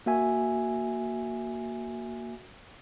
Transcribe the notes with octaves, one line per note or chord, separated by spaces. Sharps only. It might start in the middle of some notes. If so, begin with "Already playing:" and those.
A#3 F#4 E5 G#5